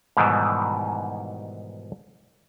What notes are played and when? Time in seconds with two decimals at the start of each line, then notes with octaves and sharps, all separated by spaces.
0.17 G#2 B2 D#3 E3 G3